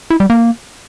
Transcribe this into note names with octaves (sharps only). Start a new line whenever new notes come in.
E4
G3
A#3